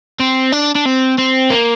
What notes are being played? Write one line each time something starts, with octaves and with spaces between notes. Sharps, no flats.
C4
D4
D4
C4
C4
A#3